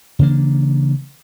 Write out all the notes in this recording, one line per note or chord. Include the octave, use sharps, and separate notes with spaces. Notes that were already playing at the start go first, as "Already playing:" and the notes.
C#3 E3 A#3 D4